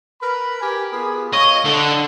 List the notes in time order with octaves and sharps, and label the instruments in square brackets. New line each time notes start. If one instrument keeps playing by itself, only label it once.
[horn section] A#4 B4 B5
G4 A#4 G#5
B3 F4 G#4
[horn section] C#5 F5 [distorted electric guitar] D#5
[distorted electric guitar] D3 [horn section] A4